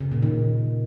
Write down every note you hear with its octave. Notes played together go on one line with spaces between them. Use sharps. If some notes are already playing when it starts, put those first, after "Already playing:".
C#3
A#2
D#3